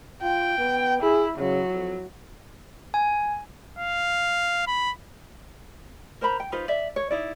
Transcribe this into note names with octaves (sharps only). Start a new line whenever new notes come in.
F4 G5
B3
E4 G#4
C#3 F#3
F2
G#5
F5
B5
A#4 C5 A#5 B5
G5
D#4 F4 B4 C5
D5 E5
C#5
D#4 E4 D5